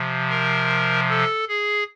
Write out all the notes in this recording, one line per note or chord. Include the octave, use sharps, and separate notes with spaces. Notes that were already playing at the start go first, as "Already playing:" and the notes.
Already playing: C3 F3
A#4
A4
G#4